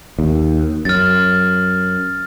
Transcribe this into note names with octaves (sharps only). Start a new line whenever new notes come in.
D#2
F#2 F6 A6